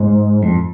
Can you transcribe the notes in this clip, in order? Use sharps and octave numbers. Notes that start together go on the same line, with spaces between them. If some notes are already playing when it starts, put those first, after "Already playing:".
Already playing: G#2
F2